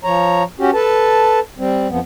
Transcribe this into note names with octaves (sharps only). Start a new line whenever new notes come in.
F3 C#5 A#5
C#4 F#4 G4
A4 B4 A5
G3 C4
F2 F3 B3